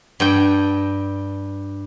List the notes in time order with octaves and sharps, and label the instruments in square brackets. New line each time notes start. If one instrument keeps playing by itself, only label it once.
[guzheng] G2 G5